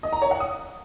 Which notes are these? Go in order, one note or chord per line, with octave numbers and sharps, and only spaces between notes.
D#5
A#5
C#5
F#5
D#6